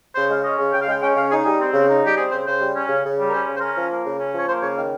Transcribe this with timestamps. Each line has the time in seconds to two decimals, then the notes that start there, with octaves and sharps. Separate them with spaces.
0.15 C#3 C5
0.30 G#3 F5
0.44 C#4 D#5
0.59 C#3
0.73 C#3 G5
0.81 F5
0.87 G#3 G5
1.02 C#4 G5
1.16 C#3 F5
1.31 D#4 G#4
1.45 G3 G#4
1.60 C4
1.74 C#3
1.88 D#4
2.03 G3 G4
2.17 C4 G#4
2.31 C#3 C5
2.45 C#3 C5
2.61 G3
2.75 C#4
2.89 C#3
3.04 C#3
3.19 G3
3.28 A#4
3.32 C#4 C5
3.47 C#3
3.56 C5
3.61 C#4 A#4
3.76 F3
3.90 A#3
4.04 C#3
4.19 C#4
4.34 F3 C#5
4.47 A#3 C5
4.62 C#3 C#5
4.77 D#3 F5